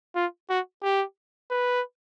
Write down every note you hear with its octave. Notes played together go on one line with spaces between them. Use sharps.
F4
F#4
G4
B4